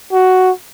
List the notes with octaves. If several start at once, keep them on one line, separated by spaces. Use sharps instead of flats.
F#4